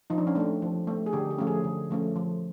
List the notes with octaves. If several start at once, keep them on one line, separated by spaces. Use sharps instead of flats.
F3 D#4
D4
C#4
A3 C4 D4
F3
A3 C4
G#4
D3 G4
G4
F3 A3 C#4
G#4
D3
F3 A3 C#4
F3